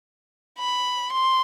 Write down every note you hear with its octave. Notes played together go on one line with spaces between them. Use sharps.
B5
C6